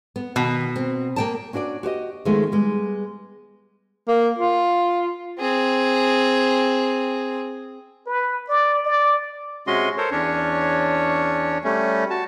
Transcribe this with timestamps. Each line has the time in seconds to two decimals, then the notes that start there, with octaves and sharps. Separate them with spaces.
0.16 B3
0.36 B2 D#3
0.76 C4
1.16 A#3 G5 A5
1.53 C#4 D4 F#4 C5 D5
1.83 F#4 G4 C5 D#5
2.25 D#3 F3 G#3 A3 B3 G#4
2.52 G3 G#3 B3
4.08 A#3
4.39 F4
5.39 C4 G#4
8.06 B4
8.49 D5
8.85 D5
9.67 C3 G#3 C#4 F#4 D#5 C6
9.98 A4 A#4 C5 C#5
10.11 E2 C#4 D4 C#5
11.64 G3 A3 C#4
12.10 F#4 A5